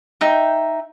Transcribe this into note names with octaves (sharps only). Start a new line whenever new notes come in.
D#4 E5 G5